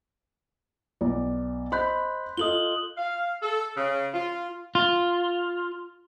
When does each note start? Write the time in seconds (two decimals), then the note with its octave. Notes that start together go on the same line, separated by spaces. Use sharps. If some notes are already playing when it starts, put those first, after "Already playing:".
1.01 B1 D5
1.72 C5 D#5 B5 C6 F#6 G6
2.37 F4 A4 D#5 D#6 F#7 G7
2.98 F5
3.42 A4
3.77 C#3
4.14 F4
4.75 F4